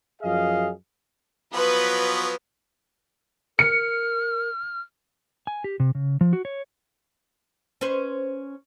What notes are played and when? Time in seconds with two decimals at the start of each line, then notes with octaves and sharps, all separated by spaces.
0.22 F#2 F3 G#4 D#5 F5
1.54 F3 F#3 B3 B4
3.59 A#4 F6 C#7
5.47 G#5
5.64 G4
5.80 C3
5.95 C#3
6.21 F3
6.33 F#4
6.45 C#5
7.81 C#4 B4 C5